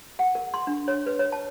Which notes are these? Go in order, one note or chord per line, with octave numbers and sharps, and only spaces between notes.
F#5
A#4
C6
D4
C#5
B4
C#5
A5